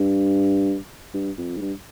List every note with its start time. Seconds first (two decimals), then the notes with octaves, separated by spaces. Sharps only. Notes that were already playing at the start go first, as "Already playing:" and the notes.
Already playing: G2
1.14 G2
1.38 F2
1.57 G#2
1.61 G2